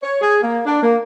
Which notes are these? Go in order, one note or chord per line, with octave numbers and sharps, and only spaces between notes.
C#5
G#4
A#3
D4
A#3